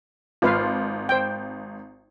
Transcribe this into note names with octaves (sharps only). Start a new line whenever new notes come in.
G#1 F4 B4 F5
C5 G5